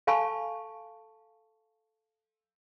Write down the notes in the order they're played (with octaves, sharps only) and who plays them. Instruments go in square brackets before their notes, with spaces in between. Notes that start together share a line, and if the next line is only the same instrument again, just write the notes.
[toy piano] A4 F5 G#5 A5 B5 C#6